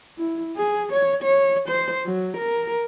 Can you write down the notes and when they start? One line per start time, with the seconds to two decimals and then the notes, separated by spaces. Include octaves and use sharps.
0.18 E4
0.57 G#4
0.93 C#5
1.23 C#5
1.68 C5
2.05 F#3
2.37 A#4